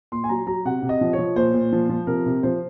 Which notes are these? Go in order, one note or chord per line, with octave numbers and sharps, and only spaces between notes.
A#2 C6
G#5
F#3 A#5
F#3 A#5
C3 F#5
C3
D#5
F3
C#5
F3
A#2 C5
A#2
F3
F3
C3 A#4
C3
F3 C5